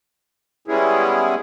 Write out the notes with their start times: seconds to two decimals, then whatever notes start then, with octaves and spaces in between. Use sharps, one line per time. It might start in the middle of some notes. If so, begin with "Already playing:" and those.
0.68 G3 G#3 B3 C#4 E4 G#4